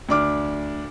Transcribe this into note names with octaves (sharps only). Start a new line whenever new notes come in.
D2 D4 D6 F6